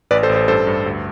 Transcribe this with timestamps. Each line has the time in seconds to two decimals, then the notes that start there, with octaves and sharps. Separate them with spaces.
0.11 A1 B4 D5
0.23 A4 C5
0.29 A1
0.36 A4 C5
0.48 G2 A4 C5
0.67 G2
0.86 D2